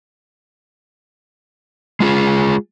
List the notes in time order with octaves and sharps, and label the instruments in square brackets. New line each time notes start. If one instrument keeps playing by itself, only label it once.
[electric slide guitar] G#3 F4 G#4